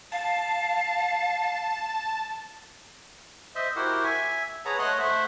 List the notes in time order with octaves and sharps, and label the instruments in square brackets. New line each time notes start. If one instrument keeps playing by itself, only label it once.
[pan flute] F5 [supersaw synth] A5
[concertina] C5 D#5 E5
E4 F#4 G4 A#4 C5 F#5
E5 G#5
G#4 B4 C#5 F#5 A5 A#5
A3 C#5 D#5 F#5 C6 F#6
A3 C5 E5 F#5